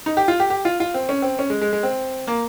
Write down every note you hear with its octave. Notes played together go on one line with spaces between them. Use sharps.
D#4
G4
F4
G4
G4
F4
F4
C4
C#4
C4
C#4
G#3
G#3
G#3
C4
A#3